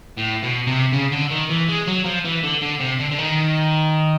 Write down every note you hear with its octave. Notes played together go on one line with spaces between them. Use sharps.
A2
B2
C3
C#3
D3
D#3
E3
G#3
F#3
F3
E3
D3
D3
C3
D3
D3
D#3